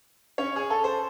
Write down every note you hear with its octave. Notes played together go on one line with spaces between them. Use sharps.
C#4 C#5
G#4
A4
C5